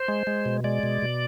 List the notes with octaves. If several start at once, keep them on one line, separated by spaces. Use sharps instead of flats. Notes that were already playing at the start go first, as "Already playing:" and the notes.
Already playing: C5
G#3
G#3
B2
G#3 D5
B2
B2